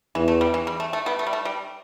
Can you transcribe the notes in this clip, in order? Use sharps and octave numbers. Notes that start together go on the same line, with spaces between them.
E2 E3
A3
G3
E3
G3
A3
A3
G3 B3
A3
G3
A3
G3